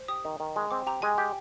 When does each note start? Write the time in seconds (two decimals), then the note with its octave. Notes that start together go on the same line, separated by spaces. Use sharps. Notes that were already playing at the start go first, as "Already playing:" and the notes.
Already playing: C5
0.08 G4 D#6
0.25 D#3
0.40 D#3
0.56 G#3
0.71 C4 D6
0.87 G4 A#5
1.02 G#3 G#5
1.18 G4